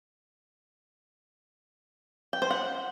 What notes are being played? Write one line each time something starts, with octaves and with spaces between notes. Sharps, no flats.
G5
C5
F#5